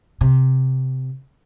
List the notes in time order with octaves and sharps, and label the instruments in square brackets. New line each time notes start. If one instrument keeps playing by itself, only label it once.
[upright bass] C3